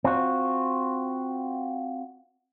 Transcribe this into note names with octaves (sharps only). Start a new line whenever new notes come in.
C4 F4 F#4